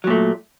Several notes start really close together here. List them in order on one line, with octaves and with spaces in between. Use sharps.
F#3 A#2 A3